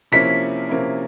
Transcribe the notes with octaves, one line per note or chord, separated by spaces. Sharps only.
C3 F3 A#3 C#4 E4 B6
C3 F3 A#3 C#4 E4